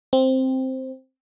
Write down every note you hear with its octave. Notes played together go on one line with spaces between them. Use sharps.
C4